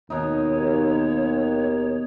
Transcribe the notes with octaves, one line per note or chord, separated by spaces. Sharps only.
D#2 B2 D#4 C#5